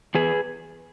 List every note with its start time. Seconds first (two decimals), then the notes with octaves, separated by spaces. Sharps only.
0.15 E2 G#4 B4